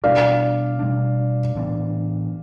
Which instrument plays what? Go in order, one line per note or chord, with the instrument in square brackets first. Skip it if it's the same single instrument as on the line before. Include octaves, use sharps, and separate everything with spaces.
[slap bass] B2 G3 D4 [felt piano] D5 F5
[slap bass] B2 G3 D4
A2 E3 B3 D4